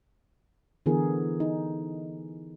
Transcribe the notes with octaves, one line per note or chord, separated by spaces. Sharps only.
D3 E3 B3 G#4 A#4
D#4